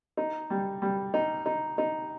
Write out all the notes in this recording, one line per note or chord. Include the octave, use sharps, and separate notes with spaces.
D#4
G3
G3
D#4
D#4
D#4